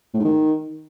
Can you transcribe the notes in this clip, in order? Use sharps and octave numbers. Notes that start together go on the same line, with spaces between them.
A2
G#2
D#3